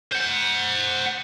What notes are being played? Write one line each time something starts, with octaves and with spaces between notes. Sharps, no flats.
C5 F#5